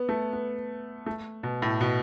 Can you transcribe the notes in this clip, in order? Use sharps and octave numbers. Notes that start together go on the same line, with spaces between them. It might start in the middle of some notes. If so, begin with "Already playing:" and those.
Already playing: B3
A3
B3
A3
B2
A2
B2